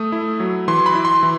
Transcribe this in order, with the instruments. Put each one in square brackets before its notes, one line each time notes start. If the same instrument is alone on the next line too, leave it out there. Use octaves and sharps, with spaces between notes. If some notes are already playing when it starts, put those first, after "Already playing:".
Already playing: [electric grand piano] A3 D#6
E4
F#3
E3 C6
B5
E4
C6
E3